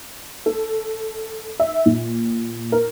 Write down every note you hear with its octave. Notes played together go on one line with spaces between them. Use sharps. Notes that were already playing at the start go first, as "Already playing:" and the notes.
A4
E5
A#2
A#4